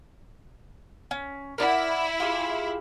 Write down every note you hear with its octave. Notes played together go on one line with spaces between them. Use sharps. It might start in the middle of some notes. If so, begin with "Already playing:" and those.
C#4
E4 A#4 D5 F#5
F4 G4 G#4